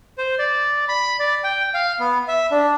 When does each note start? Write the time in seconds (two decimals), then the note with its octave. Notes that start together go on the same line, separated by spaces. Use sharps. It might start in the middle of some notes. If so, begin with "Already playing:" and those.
0.18 C5
0.39 D5
0.89 B5
1.19 D5
1.44 G5
1.74 F5
2.00 B3
2.28 E5
2.51 D4